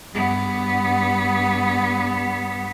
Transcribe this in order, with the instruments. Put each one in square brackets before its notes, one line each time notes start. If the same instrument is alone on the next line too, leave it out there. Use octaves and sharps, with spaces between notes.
[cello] G2 B3